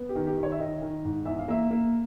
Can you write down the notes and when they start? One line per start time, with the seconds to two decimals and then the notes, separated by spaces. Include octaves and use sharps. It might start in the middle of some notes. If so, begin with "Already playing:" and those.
Already playing: B3
0.09 G4
0.15 D#3
0.27 G4
0.38 D#3
0.43 C#5
0.52 E5
0.60 D#3 D#5
0.82 D#3
1.05 G#2
1.26 E2 E5
1.39 F5
1.48 A#3 E5
1.71 A#3